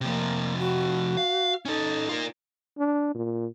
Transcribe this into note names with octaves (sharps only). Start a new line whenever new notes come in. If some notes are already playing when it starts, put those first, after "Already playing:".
C3 F3 A#3
F#4
F5
C#4 D#4 A4
F4 A#4
D4
A#2